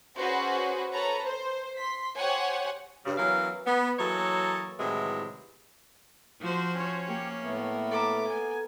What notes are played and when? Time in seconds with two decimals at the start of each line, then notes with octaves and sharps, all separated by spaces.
0.16 C#4 F#4 G#4 B4 C5
0.92 A4 B4 C#5 A#5
1.23 C5
1.78 C6 B6
2.16 G4 C5 C#5 F#5 G#5
3.05 G2 C#3 G3
3.17 E3 F#3 B3 C#4 A#4 F5
3.67 B3
3.99 E3 F#3 A#3 A4 C#5 D#5
4.79 A2 C3 D#3 E3 F#3 G#3
6.40 F3 F#4 C5
6.73 C#4 C#5
7.07 A#3 G4
7.40 A2 A3 B3
7.92 A4 E5 A#5 D6
8.27 B3 G#5